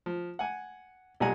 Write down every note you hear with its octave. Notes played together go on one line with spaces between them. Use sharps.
F3
F#5 G#5
B1 A#2 G3 F#5 G#5 A#5